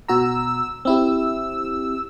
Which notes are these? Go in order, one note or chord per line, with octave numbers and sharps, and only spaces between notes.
B2 F#4 A#5 E6
C4 E4 G4 E6